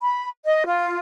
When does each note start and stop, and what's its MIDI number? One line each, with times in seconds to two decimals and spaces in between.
0.01 0.28 83
0.45 0.63 75
0.66 0.99 65